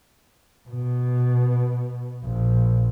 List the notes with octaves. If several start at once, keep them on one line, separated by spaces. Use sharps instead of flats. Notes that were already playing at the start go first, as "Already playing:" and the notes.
B2
A#1